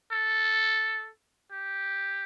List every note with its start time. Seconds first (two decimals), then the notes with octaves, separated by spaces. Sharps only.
0.12 A4
1.52 G4